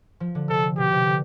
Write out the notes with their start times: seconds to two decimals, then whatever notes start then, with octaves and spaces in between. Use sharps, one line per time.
0.20 F3
0.35 D3
0.49 C3 A4
0.78 B2 G4
0.92 C3
1.06 D3